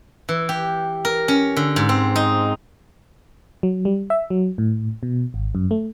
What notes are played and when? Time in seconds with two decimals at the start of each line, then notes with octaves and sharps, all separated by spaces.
0.29 E3
0.49 G4
1.05 A#4
1.28 C#4
1.57 D3
1.76 G#2
1.89 C4
2.16 D#4
3.63 F#3
3.85 G3
4.10 E5
4.30 F#3
4.58 A2
5.03 B2
5.34 G#1
5.55 F#2
5.71 A3